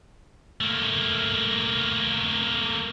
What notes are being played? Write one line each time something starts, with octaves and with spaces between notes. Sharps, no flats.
A3 A#3